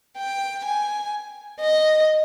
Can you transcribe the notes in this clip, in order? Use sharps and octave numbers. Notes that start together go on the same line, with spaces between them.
G5
G#5
D#5